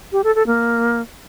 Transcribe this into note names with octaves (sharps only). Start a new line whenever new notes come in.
G4
A4
A4
A#3